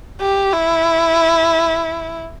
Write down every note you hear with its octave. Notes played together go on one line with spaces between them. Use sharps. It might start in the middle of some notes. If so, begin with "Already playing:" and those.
G4
E4